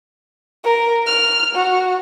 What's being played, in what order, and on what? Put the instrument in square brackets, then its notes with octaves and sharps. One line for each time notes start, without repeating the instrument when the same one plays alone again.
[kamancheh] A#4
F6
F#4